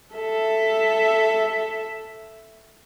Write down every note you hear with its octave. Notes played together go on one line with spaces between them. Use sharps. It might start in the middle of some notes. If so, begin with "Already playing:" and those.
A4 E5